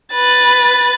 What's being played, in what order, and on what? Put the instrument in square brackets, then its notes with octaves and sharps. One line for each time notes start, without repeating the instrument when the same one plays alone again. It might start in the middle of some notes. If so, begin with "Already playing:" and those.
[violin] B4 A6